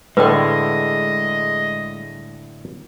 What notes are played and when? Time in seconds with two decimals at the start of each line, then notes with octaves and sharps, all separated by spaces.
0.17 A2 D3 G#3 B4 D#5 G5